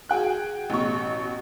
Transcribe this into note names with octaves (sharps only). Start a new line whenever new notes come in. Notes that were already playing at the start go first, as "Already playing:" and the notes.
F#4 G#4 G5 F#6
A1 B2 C#6